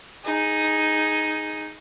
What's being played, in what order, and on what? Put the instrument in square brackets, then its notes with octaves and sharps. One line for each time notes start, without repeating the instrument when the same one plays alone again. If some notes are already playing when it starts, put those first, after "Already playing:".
[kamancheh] D#4 G#4